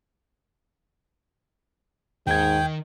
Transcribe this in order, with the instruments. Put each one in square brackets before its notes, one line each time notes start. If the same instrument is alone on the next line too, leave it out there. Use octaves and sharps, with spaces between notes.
[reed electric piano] D#2 G#6 [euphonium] G#2 [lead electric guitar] D#3 [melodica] G5